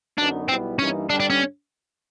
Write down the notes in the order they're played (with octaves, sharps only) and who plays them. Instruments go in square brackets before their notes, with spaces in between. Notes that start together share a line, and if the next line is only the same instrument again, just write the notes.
[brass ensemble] F#2 D3 F#3 B3 D#4 [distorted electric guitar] D4
[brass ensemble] B1 B2 G3 B3 E4 [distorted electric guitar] C4
[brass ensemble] G2 E3 G3 A#3 D#4 [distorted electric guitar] C#4
[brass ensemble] G2 D3 G3 [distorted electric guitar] D4
[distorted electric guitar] D4
C#4